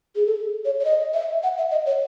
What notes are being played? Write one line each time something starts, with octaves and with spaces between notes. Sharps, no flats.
G#4
A4
C#5
C#5
D#5
E5
F#5
E5
D#5
C#5